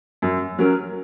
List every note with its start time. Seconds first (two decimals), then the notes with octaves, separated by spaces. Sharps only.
0.22 F#2
0.59 F#3 C#4 A#4